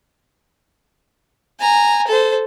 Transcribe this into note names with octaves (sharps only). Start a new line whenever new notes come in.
G#5 A#5
A4 C5